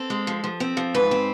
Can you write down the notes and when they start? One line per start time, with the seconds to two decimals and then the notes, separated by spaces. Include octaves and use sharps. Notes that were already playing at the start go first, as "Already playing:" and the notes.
Already playing: C4 A4
0.10 G#3
0.27 F3
0.44 F3
0.60 C4
0.77 F3
0.94 G#2 B4
1.11 C4